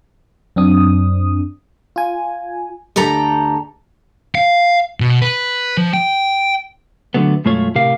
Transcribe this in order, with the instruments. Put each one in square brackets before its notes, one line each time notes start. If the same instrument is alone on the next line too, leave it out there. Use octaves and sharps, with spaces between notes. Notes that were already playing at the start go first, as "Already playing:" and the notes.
[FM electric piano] F#2 C4 D4 D#6
F4 G#5
[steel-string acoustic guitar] D2 G4 A4 A#5
[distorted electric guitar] F5
B2
B4
F3
G5
[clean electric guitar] D3 F#3 A3 B3
B1 F#2 G#3 A3 F4 C#5
A2 C3 G4 A#4 F5